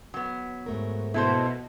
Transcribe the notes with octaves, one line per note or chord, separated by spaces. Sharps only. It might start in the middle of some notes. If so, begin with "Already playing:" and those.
F#3 B3
G#2 A3 A#4
B2 E4 A4 C5